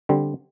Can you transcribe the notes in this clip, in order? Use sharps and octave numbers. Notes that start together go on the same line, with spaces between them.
D3 G3 C4